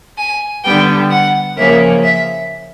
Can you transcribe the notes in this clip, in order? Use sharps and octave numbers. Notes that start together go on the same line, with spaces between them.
G#5
D3 G3 B3 G5
F#5
C#3 F3 A#3 C#4 E5
E5